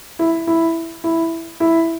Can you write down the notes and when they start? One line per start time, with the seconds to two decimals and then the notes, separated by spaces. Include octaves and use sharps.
0.19 E4
0.47 E4
1.04 E4
1.60 E4